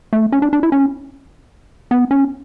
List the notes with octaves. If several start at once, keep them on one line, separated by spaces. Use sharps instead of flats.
A3
C#4
D4
D4
E4
C#4
B3
C#4